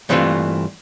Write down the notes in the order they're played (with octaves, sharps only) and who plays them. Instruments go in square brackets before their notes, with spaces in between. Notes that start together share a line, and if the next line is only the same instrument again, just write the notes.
[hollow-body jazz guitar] G2 E3 A3 C4 D4 F4